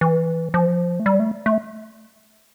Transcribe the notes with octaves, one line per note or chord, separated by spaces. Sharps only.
E3
F3
A3
G3
A3
A3